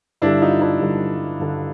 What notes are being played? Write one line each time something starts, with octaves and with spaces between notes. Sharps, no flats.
G2 D3 G3 D4 E4
D#4 F4
D4 E4
G2 D3 G3
G2 D3 G3